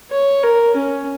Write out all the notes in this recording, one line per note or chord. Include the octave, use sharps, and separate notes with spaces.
C#5
A#4
C#4